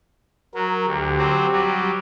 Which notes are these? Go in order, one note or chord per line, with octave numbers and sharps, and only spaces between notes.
F#3 A#4
D2 G4
F#3 C4
F#3 G3